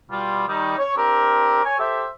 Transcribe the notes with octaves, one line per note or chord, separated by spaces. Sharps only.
B2 G3 F4
D#3 G3 D#4
C#5
C4 D4 G4 A#4
C#5 G#5
G4 A4 C5 E5